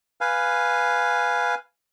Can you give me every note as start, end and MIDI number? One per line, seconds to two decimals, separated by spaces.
0.21 1.55 71
0.21 1.55 77
0.21 1.55 80